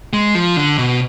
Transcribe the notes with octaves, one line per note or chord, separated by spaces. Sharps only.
G#3
F3
D3
B2